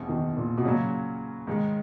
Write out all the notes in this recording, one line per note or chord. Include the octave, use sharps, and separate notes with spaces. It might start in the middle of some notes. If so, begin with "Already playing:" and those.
Already playing: F#1 E2 B2
D#3
A#2
B2
A#2 C#3 F#3 C#4 F#4
G#2 D#3 G#3